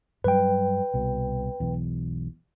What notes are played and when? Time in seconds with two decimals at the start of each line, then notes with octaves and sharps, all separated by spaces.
0.24 G2 F#3 G3 B4 G5
0.94 C2 B2
1.60 E1 B1 E2